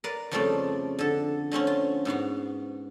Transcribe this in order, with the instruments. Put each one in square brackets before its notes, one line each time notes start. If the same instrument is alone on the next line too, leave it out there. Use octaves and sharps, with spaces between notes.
[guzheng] A#4 B4 D5 F5
F2 C#3 F3 G3 A3 D5
D3 A4
D3 A3 C4 C#4
F4
G#2 B3 F#4 F5